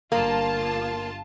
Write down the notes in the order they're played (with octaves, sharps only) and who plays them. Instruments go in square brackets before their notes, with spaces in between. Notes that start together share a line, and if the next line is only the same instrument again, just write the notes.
[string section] G1 F4 A5 [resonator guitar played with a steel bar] A#3